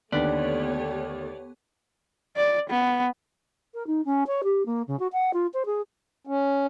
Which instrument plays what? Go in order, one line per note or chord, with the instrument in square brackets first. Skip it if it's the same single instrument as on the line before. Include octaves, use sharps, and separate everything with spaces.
[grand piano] D#2 D3 [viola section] A3 G4 C#5 [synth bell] B3 [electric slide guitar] D5
[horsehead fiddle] D5
B3
[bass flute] A#4
D#4
C#4
C#5
G4
A#3
C#3
F#4
F#5
F4
C5
G#4
[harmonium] C#4